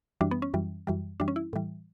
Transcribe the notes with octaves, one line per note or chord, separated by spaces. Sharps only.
F#2 E3 G3 D4
B3
C#4
F#2 E3 G3
F#2 E3 G3
F#2 E3 G3 D4
C#4
E4
A2 E3 G3